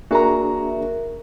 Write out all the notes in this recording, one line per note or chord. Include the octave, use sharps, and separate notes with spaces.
A#3 D4 F#4 G#4 A#4 E5 A#5